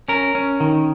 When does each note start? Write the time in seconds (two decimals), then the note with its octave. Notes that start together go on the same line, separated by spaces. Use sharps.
0.08 C#4 A#4
0.35 C#4
0.60 D#3